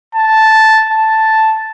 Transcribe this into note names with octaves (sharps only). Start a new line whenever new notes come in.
A5
A5